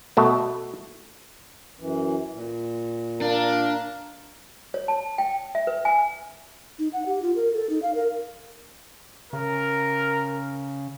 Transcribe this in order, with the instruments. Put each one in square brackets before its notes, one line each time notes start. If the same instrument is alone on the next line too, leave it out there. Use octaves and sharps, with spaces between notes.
[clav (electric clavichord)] B2 A3 B3
[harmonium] F#2 E3
A#2
[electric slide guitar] D4 [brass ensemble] A#4 F5
[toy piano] C#5
A5
G5
E5
B4
G#5
[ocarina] D#4
F#5
G4
F4
A#4
A4
D#4
F5
A#4
[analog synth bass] C#3 [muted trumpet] A#4